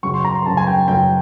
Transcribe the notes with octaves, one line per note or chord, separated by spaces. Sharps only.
F#2 C#3 F#3 C#6
C6
A#5
C6
F#2 C#3 F#3 A5
G#5
G5
F#2 C#3 F#3 G5